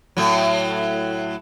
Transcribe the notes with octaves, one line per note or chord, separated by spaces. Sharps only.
A2 F#3